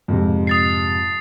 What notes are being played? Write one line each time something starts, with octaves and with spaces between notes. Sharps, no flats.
F2 G#2 C3
D#6 A6 C7